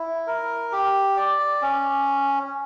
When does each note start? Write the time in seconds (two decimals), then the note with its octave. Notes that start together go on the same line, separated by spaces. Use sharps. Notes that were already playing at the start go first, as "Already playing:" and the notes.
Already playing: E4
0.27 A#4
0.72 G4
1.17 D5
1.62 C#4